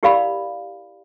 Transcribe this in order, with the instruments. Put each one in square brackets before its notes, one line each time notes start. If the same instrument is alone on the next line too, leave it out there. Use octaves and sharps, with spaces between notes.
[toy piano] E4 G4 A#4 D5 F5 B5